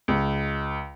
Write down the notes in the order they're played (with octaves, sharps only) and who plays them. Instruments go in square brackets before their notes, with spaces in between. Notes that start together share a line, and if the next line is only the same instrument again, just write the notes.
[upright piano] C#2